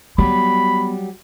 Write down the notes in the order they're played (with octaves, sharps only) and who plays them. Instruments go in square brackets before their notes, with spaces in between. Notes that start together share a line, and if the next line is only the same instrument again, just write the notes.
[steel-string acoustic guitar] F#3 G3 G4 [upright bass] B3 [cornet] B5